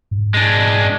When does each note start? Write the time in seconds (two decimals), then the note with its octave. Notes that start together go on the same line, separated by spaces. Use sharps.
0.11 G#2
0.34 G#3 D4